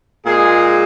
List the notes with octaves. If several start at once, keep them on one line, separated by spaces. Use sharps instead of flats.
A#2 G#3 G#4